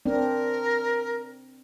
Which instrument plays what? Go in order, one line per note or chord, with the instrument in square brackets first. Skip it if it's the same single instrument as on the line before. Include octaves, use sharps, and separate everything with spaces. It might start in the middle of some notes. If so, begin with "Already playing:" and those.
[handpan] C4 D4 [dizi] A#4